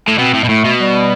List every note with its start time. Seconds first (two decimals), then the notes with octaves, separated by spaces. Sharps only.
0.08 A2
0.18 B2 C4
0.34 A2
0.44 B2
0.49 A2 A3
0.65 B2
0.80 G3